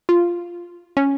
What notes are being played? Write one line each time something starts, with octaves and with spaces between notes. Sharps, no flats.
F4
C#4